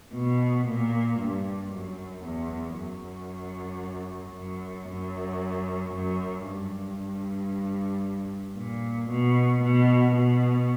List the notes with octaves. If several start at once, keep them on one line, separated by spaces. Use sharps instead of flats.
B2
A#2
G2
F#2
E2
F#2
F#2
F#2
F#2
G2
A#2
B2
B2
B2